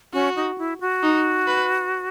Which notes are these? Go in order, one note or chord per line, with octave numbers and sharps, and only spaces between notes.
C#4 F#4
D#4
E4
F#4
D#4
B4